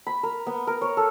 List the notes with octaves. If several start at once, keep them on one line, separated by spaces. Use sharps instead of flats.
B5
A#4
B3
A#4
C#5
A4